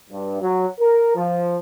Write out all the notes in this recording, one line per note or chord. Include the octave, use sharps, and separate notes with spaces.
G2
F#3
A#4
F3